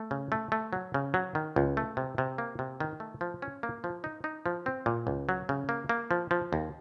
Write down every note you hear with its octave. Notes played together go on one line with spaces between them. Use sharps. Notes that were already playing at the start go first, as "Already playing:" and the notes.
Already playing: A3
C#3
A3
A3
F#3
C#3
F#3
D#3
C#2
A3
C3
C3
A#3
C3
D#3
A3
F3
C#4
A#3
F3
D#4
D#4
F3
C4
A#2
C#2
F#3
C#3
A#3
A#3
F3
F3
D#2